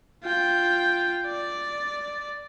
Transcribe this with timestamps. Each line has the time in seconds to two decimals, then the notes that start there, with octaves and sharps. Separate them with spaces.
0.24 F4 G5
1.27 D5